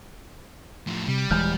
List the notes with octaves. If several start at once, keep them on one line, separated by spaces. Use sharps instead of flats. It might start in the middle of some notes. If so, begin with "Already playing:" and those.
A2 F3
C3 G3
D#1 E3 G#3 F6 G6